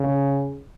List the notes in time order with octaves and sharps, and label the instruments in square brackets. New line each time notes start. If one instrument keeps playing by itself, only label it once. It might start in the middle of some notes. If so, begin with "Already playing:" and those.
Already playing: [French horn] C#3